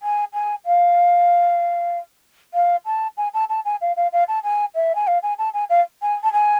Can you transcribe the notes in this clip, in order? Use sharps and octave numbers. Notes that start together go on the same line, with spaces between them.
G#5
G#5
F5
F5
A5
G#5
A5
A5
G#5
F5
F5
F5
A5
G#5
E5
G#5
F5
G#5
A5
G#5
F5
G#5
A5
G#5